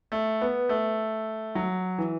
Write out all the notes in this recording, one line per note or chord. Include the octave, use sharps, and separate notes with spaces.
A3
B3
A3
F#3
E3